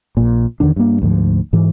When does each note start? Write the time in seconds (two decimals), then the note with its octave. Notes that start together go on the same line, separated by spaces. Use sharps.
0.17 A#1 A#2
0.60 E2 D3 D#3 D4
0.76 G2 A#3
1.02 D2 G#2 F3
1.53 G#2 E3